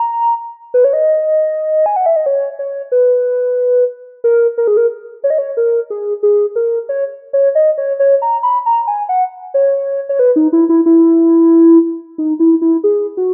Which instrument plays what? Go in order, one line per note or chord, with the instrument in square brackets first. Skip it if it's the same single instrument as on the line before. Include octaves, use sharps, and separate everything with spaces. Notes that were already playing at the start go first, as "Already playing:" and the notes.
Already playing: [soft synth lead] A#5
B4
C#5
D#5
G#5
F#5
E5
D#5
C#5
C#5
B4
A#4
A#4
G#4
A#4
C#5
D#5
C#5
A#4
G#4
G#4
A#4
C#5
C#5
D#5
C#5
C#5
A#5
B5
A#5
G#5
F#5
C#5
C#5
B4
D#4
E4
E4
E4
D#4
E4
E4
G#4
F#4